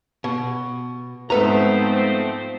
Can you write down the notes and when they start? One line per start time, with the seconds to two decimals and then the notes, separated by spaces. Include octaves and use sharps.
0.24 B2
1.30 G#2 F3 A3 B3 C4 A4 B4 A#5